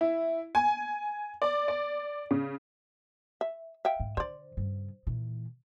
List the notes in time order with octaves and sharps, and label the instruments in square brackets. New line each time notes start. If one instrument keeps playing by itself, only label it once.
[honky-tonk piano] E4
G#5
D5
D5
C#3
[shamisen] E5
E5 F5 G5
[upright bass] G#2
[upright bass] D3 [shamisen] C5 D5
[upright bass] G2 C#3
A#2 E3